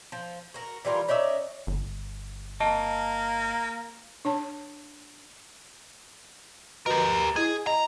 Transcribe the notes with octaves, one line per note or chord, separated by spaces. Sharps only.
F3
F#4 A#4
E3 G3 F4 A#4
C#4 D#4 D5 E5
G1
A#3 D#5 A5
D4 C#5 A5
F#4 G4 A#4 B4 D#5
E4 G#4 D#5
D#5 A#5